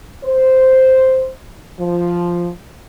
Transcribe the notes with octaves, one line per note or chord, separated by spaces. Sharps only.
C5
F3